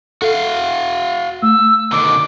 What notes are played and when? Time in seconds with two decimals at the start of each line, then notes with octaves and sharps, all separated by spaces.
0.22 F#4 A4 F5
1.42 A3 E6
1.92 B2 D3 D#3 D6